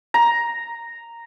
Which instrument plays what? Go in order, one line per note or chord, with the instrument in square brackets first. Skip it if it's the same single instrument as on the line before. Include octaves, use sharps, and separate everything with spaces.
[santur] A#5